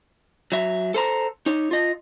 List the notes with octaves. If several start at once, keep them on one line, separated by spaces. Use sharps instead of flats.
F#3 E5
A4 C5 A#5
D#4 C#5
F4 D#5